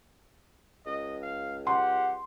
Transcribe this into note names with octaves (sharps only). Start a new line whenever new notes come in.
C#2 D#5
F5
G4 F#5 C6